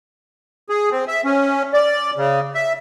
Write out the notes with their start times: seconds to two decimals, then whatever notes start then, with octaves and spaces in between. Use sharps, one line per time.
0.69 G#4
0.91 C4
1.08 E5
1.25 C#4
1.74 D5
2.17 C#3
2.55 E5